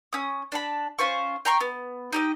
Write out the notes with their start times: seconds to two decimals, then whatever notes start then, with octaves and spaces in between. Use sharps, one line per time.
0.13 C#4 D#6
0.52 D4 A5 B5
0.99 C#4 F4 C5 C#6
1.45 G5 A#5 C6 C#6
1.61 B3
2.13 D#4 G4 D#5